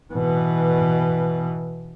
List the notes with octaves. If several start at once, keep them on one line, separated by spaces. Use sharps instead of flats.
B2 E3